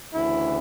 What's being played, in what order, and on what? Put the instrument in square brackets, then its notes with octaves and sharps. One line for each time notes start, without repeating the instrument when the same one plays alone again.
[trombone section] D2 C#3 E3 E4